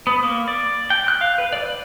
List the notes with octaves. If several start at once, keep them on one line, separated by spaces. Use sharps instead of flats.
B3
A#3
D5
G5
F#6
F5
B4
D5
D5